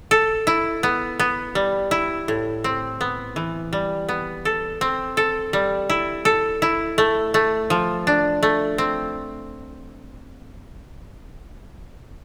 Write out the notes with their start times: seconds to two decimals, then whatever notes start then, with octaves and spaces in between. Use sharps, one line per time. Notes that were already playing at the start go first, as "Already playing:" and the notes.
0.11 A4
0.47 E4
0.83 B3
1.19 B3
1.55 G3
1.91 E4
2.28 A2
2.64 C4
3.01 B3
3.36 E3
3.73 G3
4.09 B3
4.45 A4
4.81 C4
5.17 A4
5.53 G3
5.90 E4
6.25 A4
6.62 E4
6.98 A3
7.34 A3
7.70 F3
8.07 D4
8.43 A3
8.78 C4